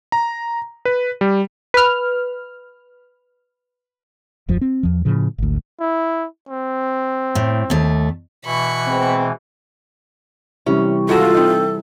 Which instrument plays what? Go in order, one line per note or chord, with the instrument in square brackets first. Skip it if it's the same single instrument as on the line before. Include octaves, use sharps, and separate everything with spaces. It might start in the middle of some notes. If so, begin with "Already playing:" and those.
[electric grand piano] A#5
B4
G3
[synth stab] B4 F6
[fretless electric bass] D1 F2 F3
C4
E2 F3
A2 C#3 F3
G#1 D2
[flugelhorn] E4
C4
[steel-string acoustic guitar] A2
D#2 A3
[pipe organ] B2 E3 [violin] B5 C#6
[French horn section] G#3 B3 C4
[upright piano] C3 E3 G3 [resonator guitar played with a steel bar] C#4
[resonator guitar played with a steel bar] D#3 G#3 F#4 [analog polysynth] F4 [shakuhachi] A4
[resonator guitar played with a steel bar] C4 D#4